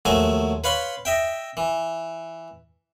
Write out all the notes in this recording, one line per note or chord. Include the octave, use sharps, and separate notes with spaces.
D#2 F3 F#3 A3 G#5
B4 C#5 F5 B5 C6
D#5 E5 G5
E3